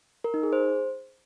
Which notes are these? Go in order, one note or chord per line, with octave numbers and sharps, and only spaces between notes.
A#4
D#4
G#4
C5